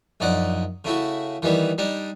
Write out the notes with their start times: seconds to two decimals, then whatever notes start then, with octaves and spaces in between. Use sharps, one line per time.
0.20 A#1 F#2 D#4 D5 F#5
0.85 C#3 A3 E4 F#4
1.42 D#3 E3 G3 B3
1.78 G3 D4 D#4